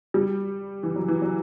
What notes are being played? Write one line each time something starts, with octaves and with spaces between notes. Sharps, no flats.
G3
E3
F#3
E3
F#3